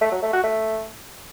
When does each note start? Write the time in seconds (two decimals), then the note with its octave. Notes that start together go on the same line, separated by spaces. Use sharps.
0.01 A3
0.12 F#3
0.22 A3
0.33 F#4
0.44 A3